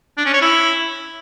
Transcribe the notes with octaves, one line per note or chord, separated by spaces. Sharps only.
D4
C#4
C#5
E4